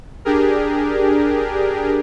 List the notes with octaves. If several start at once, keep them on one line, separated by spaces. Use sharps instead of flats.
D4 G4 G#4 A#4